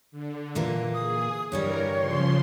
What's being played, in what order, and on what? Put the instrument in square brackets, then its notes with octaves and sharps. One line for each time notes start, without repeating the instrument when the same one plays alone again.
[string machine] D3
[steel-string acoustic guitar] A#2 E3 A#3
[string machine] G#4 [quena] D#6
[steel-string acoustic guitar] G2 D3 G3 [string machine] E3 A#4 [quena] C#5
[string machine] C#3 F3 C6